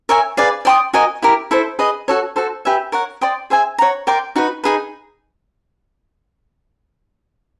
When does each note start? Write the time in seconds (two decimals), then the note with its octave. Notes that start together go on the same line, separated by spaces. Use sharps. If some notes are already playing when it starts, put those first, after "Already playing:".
0.09 A#4 C#5 E5 G#5
0.37 G#4 B4 D5 F5
0.65 D5 G5 C6 D#6
0.94 F#4 A#4 D#5 G#5
1.22 E4 G4 A#4
1.51 E4 A4 C5
1.79 G#4 B4 D#5
2.08 F#4 A4 C#5
2.36 F#4 A4 C5
2.65 G4 B4 E5 G#5
2.92 A#4 C#5 F#5
3.21 D5 G5 C6 D#6
3.50 G#4 C5 E5 G#5
3.78 C#5 F#5 A#5
4.07 A#4 D5 G5 C6
4.36 D#4 F#4 B4
4.64 D#4 G#4 B4